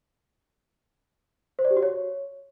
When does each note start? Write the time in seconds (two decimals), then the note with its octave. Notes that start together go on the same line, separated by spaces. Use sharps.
1.59 C5
1.65 D5
1.71 G4
1.77 F#4
1.83 C#5